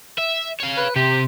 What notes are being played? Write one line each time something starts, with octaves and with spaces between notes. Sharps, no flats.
E5
C#5 F5
B4
C3 G4